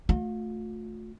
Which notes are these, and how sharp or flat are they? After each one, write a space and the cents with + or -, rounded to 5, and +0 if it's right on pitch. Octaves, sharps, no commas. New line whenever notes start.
A3 +0 F4 +40